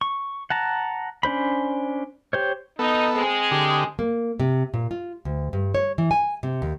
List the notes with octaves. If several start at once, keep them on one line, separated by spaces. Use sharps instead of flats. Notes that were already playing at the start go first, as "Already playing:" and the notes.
C#6
F#5 A5 A#5
C#4 D4 C5 B5
G4 C5 C#5
B3 D#4 A4
G#3 C4 G#4
D3 G4
A#3
C3
A#2
F4
D2
G2
C#5
E3
G#5
C3
D#2